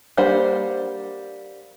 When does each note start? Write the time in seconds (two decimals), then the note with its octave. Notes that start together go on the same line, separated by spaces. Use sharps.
0.17 G3 A#3 D4 C5 F#5